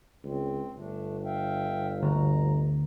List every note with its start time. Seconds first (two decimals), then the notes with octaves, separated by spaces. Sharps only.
0.24 C#2 C4
0.75 G1 A3 D4
1.24 E5 F5 G5
2.03 D2 A#5